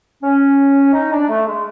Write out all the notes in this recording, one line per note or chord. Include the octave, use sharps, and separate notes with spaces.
C#4
D#4
D4
A3
G#3